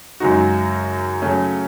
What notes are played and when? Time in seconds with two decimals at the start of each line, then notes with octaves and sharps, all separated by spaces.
0.20 F#2 C#3 G#3 D#4 F#4
1.22 C#3 F#3 A3 C#4